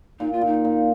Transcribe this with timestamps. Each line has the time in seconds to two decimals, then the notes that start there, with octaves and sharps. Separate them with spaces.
0.19 A#2 D#4
0.32 F4
0.42 A#2 D#4
0.65 A#2